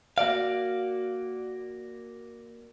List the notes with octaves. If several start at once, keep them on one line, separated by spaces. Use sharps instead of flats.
A#3 F#4 D5 F5